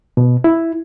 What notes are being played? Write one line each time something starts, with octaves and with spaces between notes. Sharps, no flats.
B2
E4